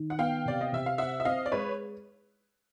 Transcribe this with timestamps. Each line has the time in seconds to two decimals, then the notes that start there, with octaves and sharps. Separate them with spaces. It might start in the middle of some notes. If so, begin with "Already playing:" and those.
Already playing: D#3
0.10 F#5
0.18 B3 F5 G5
0.45 C3 D5
0.61 D#5
0.72 C3 E5
0.86 F5
0.98 C4 E5 F#5
1.20 E5
1.25 C4 D#5 F5
1.46 D5
1.52 G#3 B4 C#5